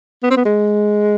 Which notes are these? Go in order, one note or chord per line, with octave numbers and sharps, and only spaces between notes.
B3
C4
B3
G#3